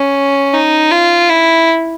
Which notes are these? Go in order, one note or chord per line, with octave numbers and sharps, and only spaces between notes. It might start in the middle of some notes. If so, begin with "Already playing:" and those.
Already playing: C#4
D#4
F4
E4